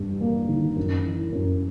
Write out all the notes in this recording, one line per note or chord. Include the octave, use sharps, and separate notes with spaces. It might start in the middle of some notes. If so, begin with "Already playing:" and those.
Already playing: G2 G3
A#3
D#3
F#2
E3
F#2